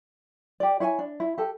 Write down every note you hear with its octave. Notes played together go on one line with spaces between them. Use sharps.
G4 D5
E4 C#5 E5 G#5
D4
E4
G4 A4